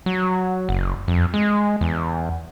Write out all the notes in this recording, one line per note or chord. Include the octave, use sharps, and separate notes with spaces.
F#3
F#1
F2
G#3
E2